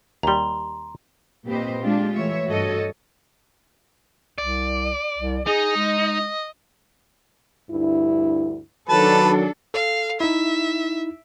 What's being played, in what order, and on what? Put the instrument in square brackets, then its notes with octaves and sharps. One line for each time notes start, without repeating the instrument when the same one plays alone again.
[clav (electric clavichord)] D#2 G3 [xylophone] A#5 C6
[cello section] A#2 C4 G4 B4 C5 D#5
G#3 D4 F4 G4
E3 A3 C#5 E5
G2 F#4 A4 C#5 D#5
[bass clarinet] C2 [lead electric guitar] D5
[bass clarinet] C2
[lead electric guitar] D#4 [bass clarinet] G#4 [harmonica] D#5
[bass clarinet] G#3
[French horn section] D2 G2 E4
[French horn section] D#3 F#3 [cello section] D4 A4 [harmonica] B4 A5
[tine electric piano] A4 [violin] F5
[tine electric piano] D#4 E4 [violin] E5